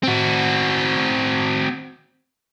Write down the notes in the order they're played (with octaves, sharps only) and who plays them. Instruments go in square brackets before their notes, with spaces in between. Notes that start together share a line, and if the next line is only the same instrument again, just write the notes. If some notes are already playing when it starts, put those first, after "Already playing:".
[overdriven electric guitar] C4 F#4